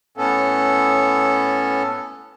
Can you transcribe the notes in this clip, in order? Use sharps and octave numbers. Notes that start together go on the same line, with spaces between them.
A2 B3 C#4 A4